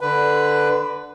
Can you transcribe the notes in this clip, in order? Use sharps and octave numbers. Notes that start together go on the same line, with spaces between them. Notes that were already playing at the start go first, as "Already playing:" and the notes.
D3 B4